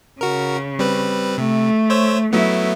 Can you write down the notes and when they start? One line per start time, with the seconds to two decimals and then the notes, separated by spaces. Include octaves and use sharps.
0.21 C#3 F#4 A#4
0.79 G3 C4 B4
1.38 C3 A3
1.90 C5 C#5 E6
2.33 F#3 A3 B3 E4